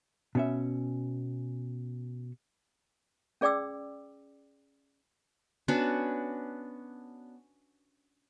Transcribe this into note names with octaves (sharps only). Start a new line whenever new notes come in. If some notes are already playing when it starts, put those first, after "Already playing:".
B2 C#4 E5
C#4 G#4 D5 G5 D6 E6
B3 C#4 D4 F#4